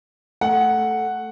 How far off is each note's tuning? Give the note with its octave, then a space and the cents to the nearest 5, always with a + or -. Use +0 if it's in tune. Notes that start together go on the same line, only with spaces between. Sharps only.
A3 +0 F#5 +0